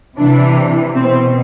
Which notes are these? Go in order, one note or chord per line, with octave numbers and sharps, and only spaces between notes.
C3 E3 D4
B2 C4